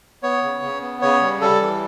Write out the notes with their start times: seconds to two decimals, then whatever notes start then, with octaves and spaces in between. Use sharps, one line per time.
0.23 B3 C#5
0.43 C#3
0.63 C#3
0.82 B3
1.02 C#3 C#5
1.21 G3
1.41 G3 A4
1.61 E3